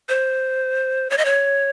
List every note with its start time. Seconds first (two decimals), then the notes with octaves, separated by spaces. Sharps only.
0.09 C5
1.10 C#5
1.18 D#5
1.25 C#5